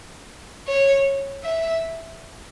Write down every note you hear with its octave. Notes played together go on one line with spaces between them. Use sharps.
C#5
E5